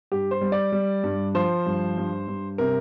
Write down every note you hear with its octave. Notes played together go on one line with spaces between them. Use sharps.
G2 G4
C5
G3
D5
G3
G2
F3 C5
G2
G2
G2
C3 A#4